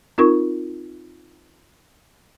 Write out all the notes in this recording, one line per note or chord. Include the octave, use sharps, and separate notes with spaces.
C4 D#4 F4 A#4 C#6